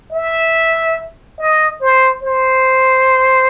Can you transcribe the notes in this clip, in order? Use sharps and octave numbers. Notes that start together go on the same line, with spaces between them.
E5
D#5
C5
C5